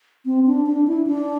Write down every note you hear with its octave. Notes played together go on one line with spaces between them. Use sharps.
C4
D4
D4
E4
D4